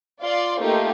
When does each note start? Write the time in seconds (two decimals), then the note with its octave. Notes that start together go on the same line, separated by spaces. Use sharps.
0.21 F4 D5 F5 C6
0.60 A3 A#3 D#4 F4 G4